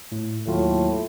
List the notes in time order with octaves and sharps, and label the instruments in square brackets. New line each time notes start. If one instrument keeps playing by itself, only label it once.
[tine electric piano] A2
[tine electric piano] D#2 F#3 F4 [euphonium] A2